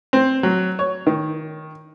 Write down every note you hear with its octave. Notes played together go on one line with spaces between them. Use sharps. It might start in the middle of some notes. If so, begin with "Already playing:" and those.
C4
F#3
C#5
D#3